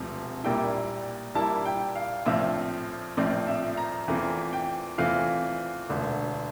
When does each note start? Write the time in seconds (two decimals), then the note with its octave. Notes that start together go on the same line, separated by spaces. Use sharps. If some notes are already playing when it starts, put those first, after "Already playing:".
Already playing: E1 D2 C3 F3
0.44 A#1 A#2 G3 A#3 E4 G5
1.35 A#1 A#2 G3 A#3 E4 A5
1.66 G5
1.95 F5
2.26 A#1 A2 F3 C4 E5
3.17 A#1 A2 F3 C4 D5
3.47 E5
3.77 A#5
4.08 E2 E3 A3 C4 F4
4.53 G5
4.98 E2 E3 A3 C4 F4 F5
5.89 E1 D2 D3